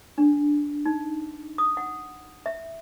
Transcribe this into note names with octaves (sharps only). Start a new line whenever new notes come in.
D4
D#4
D#6
F#5
E5